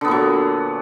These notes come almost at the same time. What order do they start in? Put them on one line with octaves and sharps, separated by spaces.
D3 B3 A#2 F#3